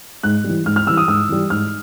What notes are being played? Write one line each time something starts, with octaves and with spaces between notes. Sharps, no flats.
G#2 F#6
E3 G3
G#2 F6
F6
E3 G3 E6
D#6
G#2 E6
E3 G3
G#2 F6